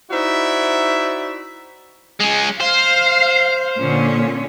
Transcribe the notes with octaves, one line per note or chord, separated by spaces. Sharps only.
D#4 E4 F#4 C5 D5 E5
G#3 C#4
C5 F5
A#2 D3 C#4